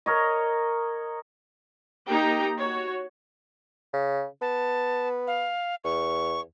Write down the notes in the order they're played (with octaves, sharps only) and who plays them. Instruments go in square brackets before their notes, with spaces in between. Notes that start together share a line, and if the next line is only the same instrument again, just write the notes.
[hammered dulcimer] A#4 C#5 D#5
[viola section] A#3 D#4 G4 G5 A#5
F#4 C#5
[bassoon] C#3
[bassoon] B3 [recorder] A5
[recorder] F5
[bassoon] E2 [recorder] C#6